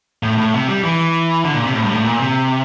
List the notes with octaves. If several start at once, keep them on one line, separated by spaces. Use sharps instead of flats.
A2
A2
C3
G3
E3
D3
A#2
C3
A2
G2
A2
A#2
C3